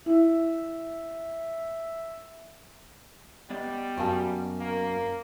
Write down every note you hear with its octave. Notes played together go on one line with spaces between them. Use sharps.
E4 E5
G3 B3 D5 D#5
F#2 F#4 F5 A5
A#3